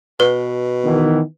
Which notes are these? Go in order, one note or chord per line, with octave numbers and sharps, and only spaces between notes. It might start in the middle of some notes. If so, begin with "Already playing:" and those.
B2 B4
D#3 E3 B3